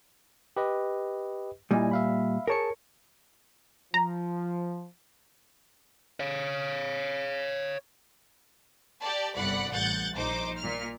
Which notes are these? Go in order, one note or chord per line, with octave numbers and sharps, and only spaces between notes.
G4 B4 D#5
A#2 G3 E4 D#5 G#5
E5 F5 B5
G#4 A#4 C#5 A5 C#7
F3 A#5
C#5 F5
G4 D5 A5
G1 C2 D5 F#5 B5 F#6
A1 F#5 F#6 G6 A6
A#1 D#4 C5 D6
A#2 F6